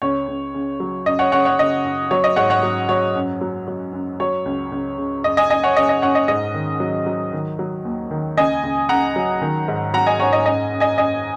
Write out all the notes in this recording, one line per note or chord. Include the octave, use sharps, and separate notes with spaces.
C#2 C#5
C#2
C#3
F#3
F#2 D#5
C#5 F#5
C#3 C#5 F#5
C#5 F#5
C#3 D#5
F#2
F#3 C#5
D#5
G#2 C#5 F#5
C#5 F#5
F#3
F#3 C#5
F#2
F#3
F#3
F#2
F#3 C#5
C#2
C#2
C#3
F#2 D#5
D#5 G#5
F#2 D#5 G#5
C#5 F#5
C#3 D#5
D#5
F#2 C#5 F#5
D#5
G#2 D#5
D#3
F#3
F#3
D#3
F#3
D#2
D#3
C#2 D#5 G#5
C#2
C#2 F#5 A#5
F#3
D#3
G#2
F#3 F#5 A#5
D#5 G#5
G#2 C#5 F#5
D#5
F#2 D#5 G#5
F#2
D#5 G#5
F#2 D#5 G#5